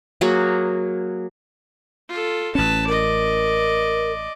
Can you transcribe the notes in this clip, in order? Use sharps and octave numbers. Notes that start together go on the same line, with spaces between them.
F#3 A#3 F#4 G#4
F4 A4
A1 C#4 B4 A5
A#4 D5 D#5